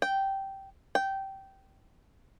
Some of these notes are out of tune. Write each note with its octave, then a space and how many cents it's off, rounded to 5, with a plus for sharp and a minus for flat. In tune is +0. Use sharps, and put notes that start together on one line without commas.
G5 -10
G5 -15